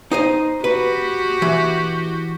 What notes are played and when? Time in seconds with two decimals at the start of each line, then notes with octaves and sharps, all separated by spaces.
0.11 D#4 C5 D#5
0.64 F#4 G4 B4
1.42 E3